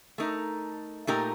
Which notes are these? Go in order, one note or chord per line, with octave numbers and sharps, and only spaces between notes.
A3 D#4 A#4
A#2 A3 D#4 G4 A#4